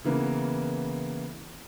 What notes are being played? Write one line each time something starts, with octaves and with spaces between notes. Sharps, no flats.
C#3 E3 A#3 B3